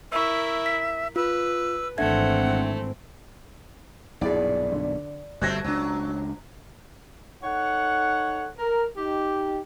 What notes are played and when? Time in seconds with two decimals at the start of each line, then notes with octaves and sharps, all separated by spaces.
0.12 E4 A#4 E5 C#6 E6
0.66 B6
1.16 F4 B4 E6
1.98 G#1 E3 A3 C4 D4 E5 F#5 G#6
4.21 B1 G2 A#2 E4 G#4 D5
4.72 D3
5.42 G1 G3 A3 C4 F#4 F#6 G#6 A#6
5.64 C#2 F#3 D4
7.44 D#4 A4 C#5 F#5
8.58 A#4
8.97 D#4 G4